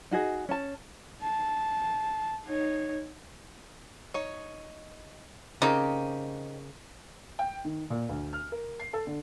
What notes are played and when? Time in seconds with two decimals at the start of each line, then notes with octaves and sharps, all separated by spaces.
0.11 D#4 F#4 G#4 D#5
0.49 C#4 A5
1.23 A5
2.46 D#4 C#5
4.14 D#4 C#5
5.62 C#3 A#3 C4 D#4 G4
7.39 G5
7.65 D#3
7.90 A#2
8.09 D2
8.33 F6
8.52 A#4
8.80 C7
8.93 A4
9.07 D3